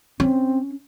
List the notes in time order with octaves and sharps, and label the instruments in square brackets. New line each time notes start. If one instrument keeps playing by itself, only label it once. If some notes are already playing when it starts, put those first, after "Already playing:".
[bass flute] C4 [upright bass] C#4